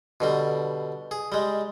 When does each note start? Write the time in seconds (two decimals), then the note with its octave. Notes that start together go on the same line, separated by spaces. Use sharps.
0.20 B2 D3 G3
1.11 G#4
1.32 G3 G#3